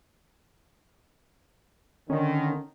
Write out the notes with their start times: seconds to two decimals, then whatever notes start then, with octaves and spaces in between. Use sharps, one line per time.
2.10 D3 D#3 C#4